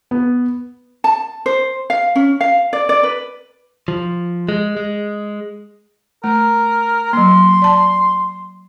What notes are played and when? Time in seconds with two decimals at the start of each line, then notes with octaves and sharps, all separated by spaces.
0.11 B3
1.04 A5
1.46 C5
1.90 F5
2.16 C#4
2.41 F5
2.73 D5
2.89 D5
3.03 B4
3.88 F3
4.49 G#3
4.77 G#3
6.24 A3 A#4
7.13 F#3 A#3 C6
7.62 D5 A5